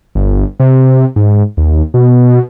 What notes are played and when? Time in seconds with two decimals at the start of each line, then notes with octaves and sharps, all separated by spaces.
0.15 G1
0.60 C3
1.16 G#2
1.57 D#2
1.94 B2